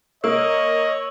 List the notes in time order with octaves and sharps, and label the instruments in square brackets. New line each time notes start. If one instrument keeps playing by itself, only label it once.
[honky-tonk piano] A#3 [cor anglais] C#5 [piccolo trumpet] D#5 [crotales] E6